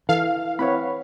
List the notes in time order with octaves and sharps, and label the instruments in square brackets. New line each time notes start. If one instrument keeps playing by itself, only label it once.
[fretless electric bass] E3 [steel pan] A4 [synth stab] F5
[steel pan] C4 E4 B4 [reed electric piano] C#5 F#5 B5